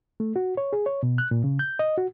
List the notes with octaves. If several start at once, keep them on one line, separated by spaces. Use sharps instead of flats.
A3
F#4
C#5
G#4
C#5
B2
F#6
A#2
C#3
G6
D#5
F#4